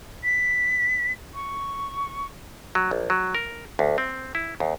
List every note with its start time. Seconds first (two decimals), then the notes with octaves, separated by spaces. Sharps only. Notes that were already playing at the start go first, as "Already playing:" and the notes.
0.23 B6
1.34 C#6
2.75 F#3
2.91 A#1
3.10 F#3
3.35 A#4
3.79 D2
3.98 C4
4.35 E4
4.60 D#2